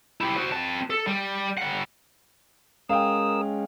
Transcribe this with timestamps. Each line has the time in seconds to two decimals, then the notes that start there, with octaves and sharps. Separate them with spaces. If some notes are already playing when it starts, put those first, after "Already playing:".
0.21 E4 G4
0.36 F#4 C5
0.52 C4 A5
0.90 A4
1.07 G3
1.58 G3 F#5
2.89 G#3 C#4 A#4 F5 G5 D#6 E6